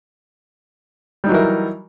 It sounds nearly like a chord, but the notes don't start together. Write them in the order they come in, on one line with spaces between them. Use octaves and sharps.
G3 D#4 F#3 E3 A#4